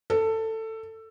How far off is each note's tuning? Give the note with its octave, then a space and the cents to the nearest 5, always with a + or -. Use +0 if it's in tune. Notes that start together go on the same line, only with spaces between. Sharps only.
A4 +15